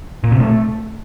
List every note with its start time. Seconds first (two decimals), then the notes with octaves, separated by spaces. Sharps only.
0.24 A#2
0.32 C3
0.40 A3